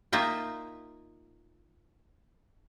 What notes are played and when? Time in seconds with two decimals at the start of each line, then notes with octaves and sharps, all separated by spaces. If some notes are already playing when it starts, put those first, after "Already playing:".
0.13 A#3 D#4 F4 E5 G5